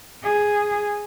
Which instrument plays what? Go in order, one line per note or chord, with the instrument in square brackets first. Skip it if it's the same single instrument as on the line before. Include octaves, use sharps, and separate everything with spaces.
[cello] G#4